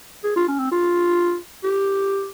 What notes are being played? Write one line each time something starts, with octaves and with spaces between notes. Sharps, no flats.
G#4
F4
C#4
C4
F4
G4